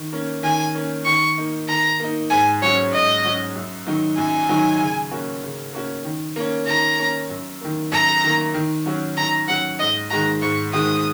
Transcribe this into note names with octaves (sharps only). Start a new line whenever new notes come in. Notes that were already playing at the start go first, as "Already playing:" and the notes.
Already playing: D#3
A#3 C#4
D#3 G#5
A#3 C#4
D#3 C#6
A#3 D#4
D#3 A#5
A#3 D#4
G#2 G#5
F#3 C#4 F#4 C#5
G#2 D#5
F#3 C#4 F#4
F#2
D#3 F#3 D#4
F#2 G#5
D#3 F#3 D#4
C#3
A#3 C#4 F#4
C#3
A#3 C#4 F#4
D#3
A#3 C#4
D#3 A#5
A#3 C#4
F#2
D#3 A#3
F#2 A#5
D#3 A#3
D#3
F#3 C#4 F#4
D#3 A#5
F#3 C#4 F#4 F#5
G#2 D#5
D#3 G#3 F#4 A#5
G#2 C#6
D#3 G#3 F#4 D#6